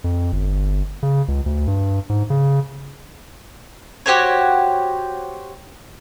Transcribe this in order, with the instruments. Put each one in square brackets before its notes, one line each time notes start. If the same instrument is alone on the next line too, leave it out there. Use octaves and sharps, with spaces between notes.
[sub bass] F2
G1
C#3
C#2
D2
G2
G#2
C#3
[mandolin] F#4 G4 C5 C#5